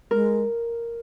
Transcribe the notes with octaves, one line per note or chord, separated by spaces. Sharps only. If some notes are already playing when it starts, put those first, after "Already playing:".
G#3 A#4